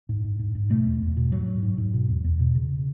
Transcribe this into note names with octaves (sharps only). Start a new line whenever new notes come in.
G#2
G#2
G#2
G#2
B2 A3
E2
E2
B2
G#2 F#3
G#2
G#2
G#2
B2
E2
E2
B2
C#3